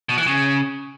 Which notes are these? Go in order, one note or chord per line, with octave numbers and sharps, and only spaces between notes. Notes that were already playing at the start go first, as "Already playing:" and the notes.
B2
E3
C#3